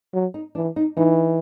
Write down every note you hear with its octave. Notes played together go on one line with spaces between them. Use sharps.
F#3
D#4
E3 D4
D#4
E3 D#4